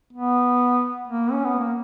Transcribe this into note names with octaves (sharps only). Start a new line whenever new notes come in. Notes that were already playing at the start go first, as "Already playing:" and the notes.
B3
A#3
C#4
B3
A#3